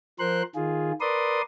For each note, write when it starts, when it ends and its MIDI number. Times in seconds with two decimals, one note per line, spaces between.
0.19 0.43 53
0.19 0.43 70
0.19 0.43 72
0.19 0.43 84
0.19 0.43 90
0.55 0.92 51
0.55 0.92 65
0.55 0.92 68
1.01 1.42 70
1.01 1.42 71
1.01 1.42 74
1.01 1.42 84
1.01 1.42 87